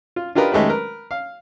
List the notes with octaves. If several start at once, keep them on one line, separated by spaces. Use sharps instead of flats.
F4
D4 F4 G4 A#4 B4 D#5
D#3 G#3 A3 G4 B4
A#4 B4
F5